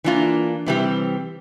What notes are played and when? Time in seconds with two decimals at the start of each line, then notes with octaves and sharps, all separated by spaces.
0.04 E3 A#3 D4 F4
0.66 C3 E3 G3 C4 G4